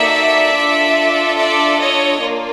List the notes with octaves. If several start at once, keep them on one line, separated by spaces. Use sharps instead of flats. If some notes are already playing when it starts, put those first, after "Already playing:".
Already playing: A#3 D#4 F#4 A4 D5 E5
D4 F4 A4
D5 E5
C#5 D#5
A#3 D4 F4